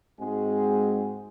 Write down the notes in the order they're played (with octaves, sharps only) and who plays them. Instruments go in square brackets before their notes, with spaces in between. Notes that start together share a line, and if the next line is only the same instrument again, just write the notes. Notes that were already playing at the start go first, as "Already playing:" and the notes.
[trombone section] G#2 G#3 C4 F#4 G#4